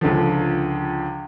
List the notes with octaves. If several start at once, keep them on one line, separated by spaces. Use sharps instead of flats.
C#2 D3 F3